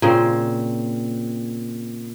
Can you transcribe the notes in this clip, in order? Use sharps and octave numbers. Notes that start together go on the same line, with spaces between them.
A#2 C#3 C4